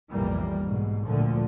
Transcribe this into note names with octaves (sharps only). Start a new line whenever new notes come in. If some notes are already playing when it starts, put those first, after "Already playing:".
B1 F2 A2 E3 G3 A#3
G#2 B2
D2 A#2 D3 F3